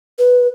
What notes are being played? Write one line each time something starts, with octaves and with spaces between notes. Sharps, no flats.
B4